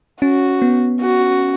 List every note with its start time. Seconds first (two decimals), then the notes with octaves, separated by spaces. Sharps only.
0.22 C#4 F#4
0.62 B3
1.02 F#4